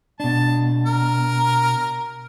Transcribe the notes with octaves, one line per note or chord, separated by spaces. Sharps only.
B2 D4 A5
A#4